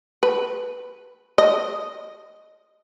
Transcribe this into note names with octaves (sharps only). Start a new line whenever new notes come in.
B4
D#5